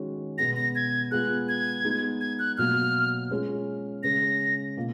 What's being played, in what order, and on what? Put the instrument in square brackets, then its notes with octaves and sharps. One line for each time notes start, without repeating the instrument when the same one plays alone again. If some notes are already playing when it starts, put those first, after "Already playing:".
Already playing: [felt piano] D#3 G#3 C#4 F#4
[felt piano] B2 G#3 B3 [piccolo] A#6
[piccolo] A#6
G#6
[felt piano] G#3 B3 F4 G#4 [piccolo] F#6
[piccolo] G#6
[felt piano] G#3 B3 D#4
[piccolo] G#6
F#6
[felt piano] B2 F#3 A#3 [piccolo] F6
[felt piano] G#3 C#4 F4 G#4
[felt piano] C#3 G#3 C#4 [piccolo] A#6
[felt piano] B2 A#3 F4